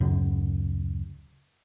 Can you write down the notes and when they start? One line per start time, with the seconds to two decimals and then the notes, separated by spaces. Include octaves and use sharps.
0.01 D1 F#2 C#3